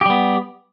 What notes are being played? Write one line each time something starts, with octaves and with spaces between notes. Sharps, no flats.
G3 B3 G4